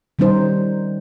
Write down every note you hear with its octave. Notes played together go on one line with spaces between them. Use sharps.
D#3 G3 C#4 D#4 C5